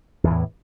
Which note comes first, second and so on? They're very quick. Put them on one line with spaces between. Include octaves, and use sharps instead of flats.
E2 E3 A2